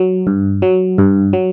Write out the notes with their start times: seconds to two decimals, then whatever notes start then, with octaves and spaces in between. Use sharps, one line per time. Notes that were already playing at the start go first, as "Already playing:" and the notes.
Already playing: F#3
0.27 G2
0.62 F#3
0.98 G2
1.33 F#3